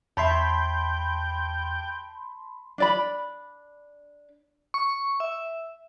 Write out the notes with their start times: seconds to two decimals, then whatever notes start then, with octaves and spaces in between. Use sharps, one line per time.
0.17 E2 C#5 E5 G5 A5 B5 C6
2.78 D4 D5 B5
4.74 C#6
5.20 E5